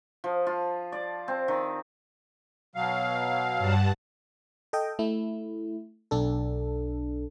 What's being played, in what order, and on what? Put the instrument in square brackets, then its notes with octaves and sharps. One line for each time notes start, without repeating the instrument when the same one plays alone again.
[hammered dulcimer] F3
F4
D5
C4
D#3
[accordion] B2 F#3 F5
[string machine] G2 F#5 A5
[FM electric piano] A4 D#5 G5
A3 E4
B1 D4 A4